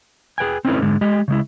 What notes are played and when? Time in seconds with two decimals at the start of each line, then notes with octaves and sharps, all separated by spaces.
0.38 G#4 B4 G5 G#5
0.65 C4 C#4 D#4 E4 A4 B4
0.82 G#2 D3 G#3
1.01 G#3 G4 D#5
1.28 C#3 G#3 E4